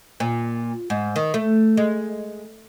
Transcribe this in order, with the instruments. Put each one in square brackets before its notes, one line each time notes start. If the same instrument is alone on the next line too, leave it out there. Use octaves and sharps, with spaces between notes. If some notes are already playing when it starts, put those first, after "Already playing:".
[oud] A#2
G#2
D#3
A3
G#3